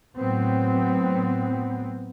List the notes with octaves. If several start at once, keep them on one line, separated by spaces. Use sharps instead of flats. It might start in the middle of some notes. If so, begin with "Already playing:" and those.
A2 F#3 B3 C4